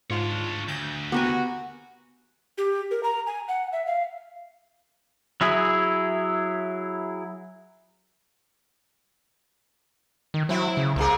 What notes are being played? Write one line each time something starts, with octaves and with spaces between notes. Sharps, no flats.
G#2 D4 F4 C#5
D2 G6
B3 F#4 G4 A#4 G#5
G4
A#4
A#5
G#5
F#5
E5
F5
F#3 E4 G#4
D#3
F#3 C4 E4
C#3
C2 C3 A#3 G#4